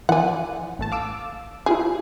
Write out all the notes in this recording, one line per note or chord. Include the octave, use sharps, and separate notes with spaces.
E3 F3 D5 F#5 G#5
A1 A3 A5
F5 D6 E6
E4 F4 G4 G#4